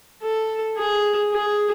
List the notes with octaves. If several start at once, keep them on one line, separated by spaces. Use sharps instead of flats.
A4
G#4
G#4